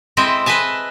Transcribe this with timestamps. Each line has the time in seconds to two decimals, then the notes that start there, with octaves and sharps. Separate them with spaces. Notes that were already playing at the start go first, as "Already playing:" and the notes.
0.17 G#3 C4 E4 D#5 E5
0.46 B4 D#5 E5 G#5 A5